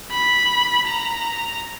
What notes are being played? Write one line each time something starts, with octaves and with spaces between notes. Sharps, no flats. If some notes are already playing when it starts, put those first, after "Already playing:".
B5
A#5